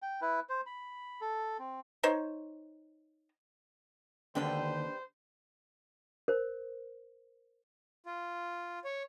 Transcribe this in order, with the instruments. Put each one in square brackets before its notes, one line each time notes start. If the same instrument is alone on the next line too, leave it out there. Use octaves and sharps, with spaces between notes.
[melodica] G5
E4 B4
C5
B5
A4
C4
[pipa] D#4 C5 C#5
[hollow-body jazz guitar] D#2 D3 D4 [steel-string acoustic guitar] G3 B4 G5 [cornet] C5
[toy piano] A#4 C5
[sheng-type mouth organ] F4
C#5